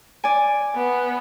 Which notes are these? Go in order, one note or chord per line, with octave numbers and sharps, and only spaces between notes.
D5 G#5
B3